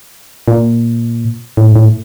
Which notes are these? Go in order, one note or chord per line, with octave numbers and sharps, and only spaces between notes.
A#2
A2
G#2
A2